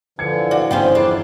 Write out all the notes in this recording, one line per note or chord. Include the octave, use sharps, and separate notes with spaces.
D3 E3 F3 G#6 C#7
F#4 D5 F5 F#5
G1 E2 B3 C#4 C5 G5 G#5
F3 D4 E4 G#4 D5